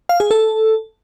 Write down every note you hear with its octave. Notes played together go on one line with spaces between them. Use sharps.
F5
G#4
A4